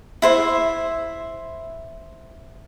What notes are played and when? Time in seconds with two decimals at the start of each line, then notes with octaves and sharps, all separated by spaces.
0.22 E4 C5 E5